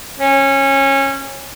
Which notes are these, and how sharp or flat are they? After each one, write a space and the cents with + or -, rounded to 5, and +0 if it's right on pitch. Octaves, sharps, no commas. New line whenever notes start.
C#4 -20